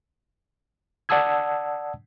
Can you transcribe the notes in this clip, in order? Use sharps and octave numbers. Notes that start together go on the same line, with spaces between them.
D5 F#5 A5 D#6 E6 G#6